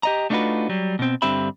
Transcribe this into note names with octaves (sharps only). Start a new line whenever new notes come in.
G4 D#5 A#5
A3 D4 D#4 F4 F#4 B4
F#3 G3
B2 C4
G2 D3 C4 G4 E5 B5